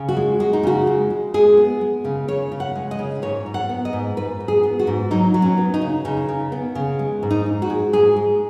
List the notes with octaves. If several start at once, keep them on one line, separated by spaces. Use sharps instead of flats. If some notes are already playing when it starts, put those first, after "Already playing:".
Already playing: C#3
F#4
G#3
G#3 F#4
D#4
C#3 F#4
G#3
G#3
G#3 G#4
B3
G#3
C#3
C#3 C#5
C#3
F#5
G#3
D#5
C#3
G#2 C#5
G#2
F#5
B3
D#5
G#2
G#2 B4
G#2
G#4
B3
F#4
G#2
F#3 D#4
F#3
C#4
B3
D#4
C#3
C#3 D#4
C#3
B3
C#3
G#3
G#2
D#4
G#3
F#4
G#3
G#2 G#4
G#3